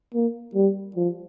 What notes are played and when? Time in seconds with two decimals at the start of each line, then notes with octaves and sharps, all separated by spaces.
0.14 A#3
0.55 G3
0.96 F3